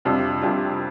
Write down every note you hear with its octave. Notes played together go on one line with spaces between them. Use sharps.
F2 C3 G3 D4 F4
F2 C3 G3 D4 F4